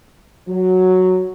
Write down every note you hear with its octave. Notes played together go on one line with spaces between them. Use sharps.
F#3